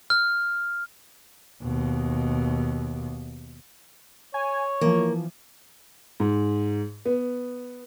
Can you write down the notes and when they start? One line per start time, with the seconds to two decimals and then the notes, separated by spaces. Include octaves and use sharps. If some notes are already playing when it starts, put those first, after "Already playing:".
0.10 F6
1.62 D#2 B2
4.34 C#5 G#5
4.81 E3 F3 A#3
6.20 G#2
7.05 B3